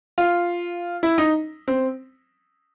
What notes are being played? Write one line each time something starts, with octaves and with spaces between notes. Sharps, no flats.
F4
E4
D#4
C4